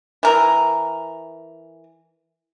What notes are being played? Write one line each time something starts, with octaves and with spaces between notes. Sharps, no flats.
E3 A#4